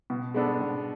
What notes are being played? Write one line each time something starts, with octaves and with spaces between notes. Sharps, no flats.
B2
G#3 B3 D4 A4
B2